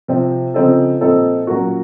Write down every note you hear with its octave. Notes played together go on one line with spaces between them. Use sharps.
C3 F3 C4
C#3 F3 C4 D#4 A4
A#2 F3 C4 D#4 A4
A#2 F#3 A#3 C#4 F#4